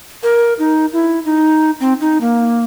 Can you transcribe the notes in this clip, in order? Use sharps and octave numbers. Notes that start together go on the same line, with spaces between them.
A#4
D#4
E4
D#4
C4
D#4
A#3